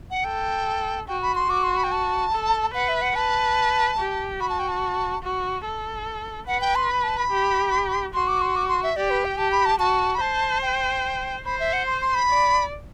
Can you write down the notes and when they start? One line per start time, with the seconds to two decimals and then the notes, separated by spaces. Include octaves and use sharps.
0.11 F#5
0.24 A4 G5
1.08 F#4 G5
1.22 B5
1.35 C6
1.49 F#4 D6
1.64 C6
1.77 B5
1.84 G5
1.92 A5
2.33 A4
2.74 B4 F#5
2.89 E5
3.02 F#5
3.15 B4 A5
3.99 G4
4.40 F#4 B5
4.49 A5
4.59 G5
4.68 A5
5.23 F#4
5.65 A4
6.47 B4 F#5
6.61 G5
6.76 C6
6.90 B5
7.03 A5
7.17 B5
7.31 G4
8.14 F#4 C6
8.28 D6
8.41 C6
8.56 D6
8.68 C6
8.83 E5
8.96 G4 D5
9.10 B4
9.25 G5
9.38 G4 A5
9.52 B5
9.66 A5
9.80 F#4 A5
10.15 B5
10.21 C5 A5
10.62 G5
11.45 C5 B5
11.60 E5
11.73 F#5
11.87 C6
12.01 C6
12.15 B5
12.29 D5